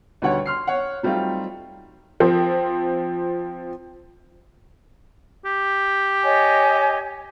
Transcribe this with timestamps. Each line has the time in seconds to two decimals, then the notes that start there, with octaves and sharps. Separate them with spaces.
0.22 D2 B2 D#3 G3 C#5 F#5
0.46 C6 F6 C7
0.67 C#5 F#5
1.03 F#3 G3 A3 C4 D#4 F4
2.20 F3 C4
5.46 G4
6.22 C#5 D#5 G#5